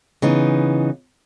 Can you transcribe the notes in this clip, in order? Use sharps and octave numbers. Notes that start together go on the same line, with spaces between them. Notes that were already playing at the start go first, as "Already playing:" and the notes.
C#3 E3 B3 D#4